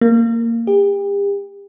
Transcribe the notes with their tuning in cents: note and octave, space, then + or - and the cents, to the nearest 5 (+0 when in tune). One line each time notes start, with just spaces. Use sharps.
A#3 -10
G4 +40